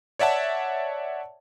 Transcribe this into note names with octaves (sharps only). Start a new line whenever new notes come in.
C#5 D5 E5 F#5 A5